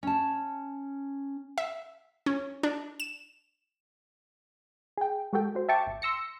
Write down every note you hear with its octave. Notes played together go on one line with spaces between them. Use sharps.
C#4 A5
E5
C#4
D4
E7
G#4 G5
G#3 F#4 G4 A4 G5
F#4 C5
E5 G5 A5 C#6 D6
G#1
C6 E6 A#6 C#7